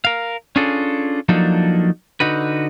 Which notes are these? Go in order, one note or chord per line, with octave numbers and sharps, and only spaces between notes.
A#4 F5
C#4 D4 F4 G#4 A4
F3 F#3 A#3 D4 D#4 A4
D3 D#4 F#4 B4